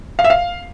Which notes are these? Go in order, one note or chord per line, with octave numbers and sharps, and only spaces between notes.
F5
E5
F5